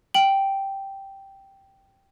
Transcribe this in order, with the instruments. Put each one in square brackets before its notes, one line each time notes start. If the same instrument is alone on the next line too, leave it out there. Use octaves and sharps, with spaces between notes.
[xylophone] G5 F#7